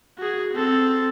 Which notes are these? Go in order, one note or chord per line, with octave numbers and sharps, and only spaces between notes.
F#4 G#4
C4 A4